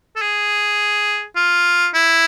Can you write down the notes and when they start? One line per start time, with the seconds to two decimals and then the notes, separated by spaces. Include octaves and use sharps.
0.16 A4
0.22 G#4
1.36 F4
1.94 E4